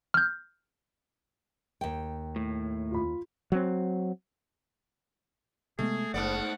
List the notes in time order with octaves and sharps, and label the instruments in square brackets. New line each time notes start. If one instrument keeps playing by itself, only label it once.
[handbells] F6 G6
[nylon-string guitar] D#2 G5
[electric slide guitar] A2
[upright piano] F4 B5
[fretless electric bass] F#3 C4
[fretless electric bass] C3 G#3 B3 [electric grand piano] A3 [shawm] G#4
[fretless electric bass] F#1 [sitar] G#2 B3 D5 [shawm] F#5